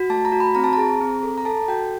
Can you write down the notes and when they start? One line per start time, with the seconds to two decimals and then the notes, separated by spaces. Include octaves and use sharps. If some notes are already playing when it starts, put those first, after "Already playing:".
Already playing: F#4
0.10 A3 A5
0.25 A#5
0.32 F#4
0.40 B5
0.55 C4 A#5
0.64 A5
0.73 G#4 A#5
1.01 C4
1.23 A4
1.38 A#5
1.45 A4 A5
1.68 F#4 G5